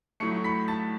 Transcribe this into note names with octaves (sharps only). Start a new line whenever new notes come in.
A2 F#3 A3 C#6 C#7
B5 B6
A5 A6